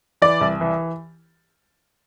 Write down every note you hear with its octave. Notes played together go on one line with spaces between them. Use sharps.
E3 D5
C2
E3